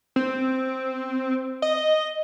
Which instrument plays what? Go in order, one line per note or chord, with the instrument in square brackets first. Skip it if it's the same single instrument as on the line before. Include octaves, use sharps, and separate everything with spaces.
[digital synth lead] C4
D#5